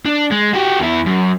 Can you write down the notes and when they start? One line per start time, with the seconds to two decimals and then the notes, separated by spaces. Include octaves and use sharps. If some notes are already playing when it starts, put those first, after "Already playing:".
0.05 D4
0.31 G#3
0.53 F#4 G4
0.79 E2 E4
1.07 F#2